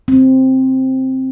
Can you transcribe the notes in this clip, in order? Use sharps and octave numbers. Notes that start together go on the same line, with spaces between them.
C4